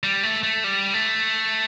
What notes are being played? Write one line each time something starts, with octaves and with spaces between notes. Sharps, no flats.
G3
A3
A3
G3
A3